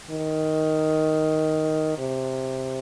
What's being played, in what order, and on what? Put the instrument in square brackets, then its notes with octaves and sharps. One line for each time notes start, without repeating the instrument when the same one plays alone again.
[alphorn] D#3
C3